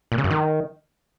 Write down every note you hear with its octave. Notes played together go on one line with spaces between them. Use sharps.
A#2
C#3
F#2
D#3